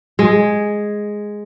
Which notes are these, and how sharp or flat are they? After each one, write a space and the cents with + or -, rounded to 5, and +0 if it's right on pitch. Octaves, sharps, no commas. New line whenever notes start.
G#3 +0